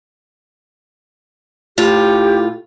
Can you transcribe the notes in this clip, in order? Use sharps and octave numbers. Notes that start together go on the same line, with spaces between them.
A2 F4 G4